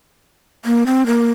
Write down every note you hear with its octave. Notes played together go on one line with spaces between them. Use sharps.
A#3
C4
A#3